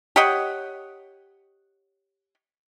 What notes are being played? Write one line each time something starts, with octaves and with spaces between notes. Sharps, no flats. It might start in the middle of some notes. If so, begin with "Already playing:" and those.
G4 C#5 D#5 F#5